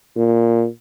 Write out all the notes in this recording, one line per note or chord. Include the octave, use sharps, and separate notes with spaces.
A#2